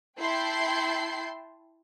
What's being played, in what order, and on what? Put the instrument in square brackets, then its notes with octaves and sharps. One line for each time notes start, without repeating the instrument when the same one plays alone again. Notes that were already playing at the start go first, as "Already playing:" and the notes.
[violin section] E4 G5 A5 C6 G6 C7